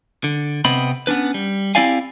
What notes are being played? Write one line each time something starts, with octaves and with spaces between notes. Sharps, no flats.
D3
C3 B3 C4 D#5 B5
B3 C#4 D4 B4
G3
C4 E4 G4 D5 F5 G#5